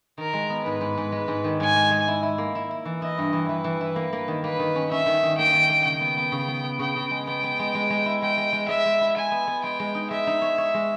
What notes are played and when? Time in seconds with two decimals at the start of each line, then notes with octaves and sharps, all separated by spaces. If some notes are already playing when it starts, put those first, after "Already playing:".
0.18 D#3 A#4
0.33 G#3
0.50 B3
0.65 G#2 B4
0.81 G#2
0.98 G#2
1.12 G#3
1.28 G#2
1.44 D#3
1.60 G#2 G#5
1.76 G#3
1.91 G#3
2.08 E4
2.23 E4
2.38 A#3
2.55 E4
2.71 E4
2.85 E3
3.02 E4 D#5
3.18 G2
3.33 E3
3.49 E3 B4
3.64 E3
3.81 E4
3.96 A#3
4.13 A#3
4.28 D#3
4.43 A#3 B4
4.59 D#3
4.76 C#4
4.91 C#4 E5
5.06 D#3
5.23 D#3
5.38 A#3 G5
5.53 D#3
5.70 A#3
5.85 C#3 G5
6.01 B3
6.17 B3
6.32 C#3
6.48 B3
6.64 B3
6.79 C#3 G5
6.96 C#3
7.11 G#3
7.27 B3 G5
7.43 B3
7.59 G#3
7.75 G#3
7.90 G#3
8.06 E4
8.22 G#3 G5
8.37 G#3
8.53 G#3
8.68 G#3 E5
8.85 G#3
9.01 E4
9.16 G#3 G#5
9.31 B3
9.47 B3
9.63 G#3 G5
9.80 G#3
9.95 D#4
10.10 G#3 E5
10.27 D#4
10.42 C#5
10.58 C#5
10.74 G#3